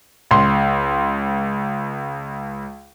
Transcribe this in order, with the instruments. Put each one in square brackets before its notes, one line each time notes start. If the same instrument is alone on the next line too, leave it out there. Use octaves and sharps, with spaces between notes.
[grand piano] C#2 C6